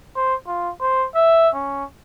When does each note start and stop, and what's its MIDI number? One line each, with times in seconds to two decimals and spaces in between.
0.16 0.35 72
0.47 0.71 65
0.81 1.07 72
1.15 1.49 76
1.54 1.84 61